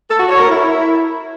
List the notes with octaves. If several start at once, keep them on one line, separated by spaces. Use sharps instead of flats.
A4
F#4
C#5
A#4
E4